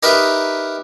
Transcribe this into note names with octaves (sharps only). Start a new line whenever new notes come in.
D#4 G4 A#4 B4 D#5 E5